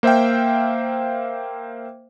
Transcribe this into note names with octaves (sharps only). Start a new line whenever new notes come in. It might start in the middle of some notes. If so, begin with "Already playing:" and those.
A#3 C5 E5 F5 G5